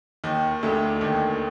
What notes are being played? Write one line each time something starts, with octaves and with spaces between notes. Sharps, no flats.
D#2 D#3
D2 D3
D#2 D#3